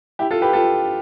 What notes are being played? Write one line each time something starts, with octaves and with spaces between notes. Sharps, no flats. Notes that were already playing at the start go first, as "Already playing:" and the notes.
E4 G4
F4 A4
G4 B4
F4 A4